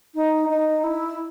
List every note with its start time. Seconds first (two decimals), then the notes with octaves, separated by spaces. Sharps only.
0.14 D#4
0.49 D#4
0.83 E4